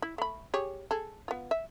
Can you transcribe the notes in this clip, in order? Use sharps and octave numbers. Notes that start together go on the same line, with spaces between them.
E4
A3 B5
G4 G#4 C#5
G#4 A4
B3 F4
E5